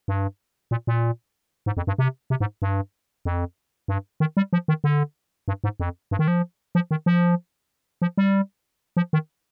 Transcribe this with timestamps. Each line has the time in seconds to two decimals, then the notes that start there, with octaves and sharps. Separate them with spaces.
0.08 G2
0.71 A#2
0.87 A#2
1.66 G#2
1.77 F2
1.87 G2
1.99 C3
2.30 C3
2.40 G#2
2.62 G2
3.25 F2
3.88 G2
4.20 D#3
4.37 G3
4.53 F3
4.68 D#3
4.84 D3
5.48 G2
5.64 G#2
5.80 F2
6.11 G2
6.19 D#3
6.28 F3
6.75 F3
6.91 D#3
7.06 F3
8.02 F3
8.18 G3
8.97 F3
9.13 D#3